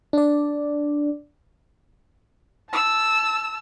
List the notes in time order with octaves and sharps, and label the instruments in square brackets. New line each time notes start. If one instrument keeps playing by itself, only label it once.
[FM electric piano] D4 D5
[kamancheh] A5 E6